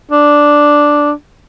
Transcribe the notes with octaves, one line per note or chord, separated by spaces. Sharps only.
D4